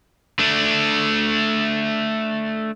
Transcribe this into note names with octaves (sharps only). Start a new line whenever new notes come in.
A3 D4